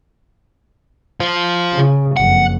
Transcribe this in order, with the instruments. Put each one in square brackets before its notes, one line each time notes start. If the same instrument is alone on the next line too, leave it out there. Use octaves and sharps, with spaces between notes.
[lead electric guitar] F4 C5
[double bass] C#3
[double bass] F#1 F2 [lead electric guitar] F#5